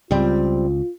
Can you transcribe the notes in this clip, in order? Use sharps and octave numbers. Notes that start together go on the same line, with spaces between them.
C#2 G3 C4 F4